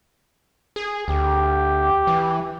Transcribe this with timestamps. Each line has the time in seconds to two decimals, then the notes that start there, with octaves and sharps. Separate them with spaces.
0.76 G#4
1.08 D2 G4
2.07 E3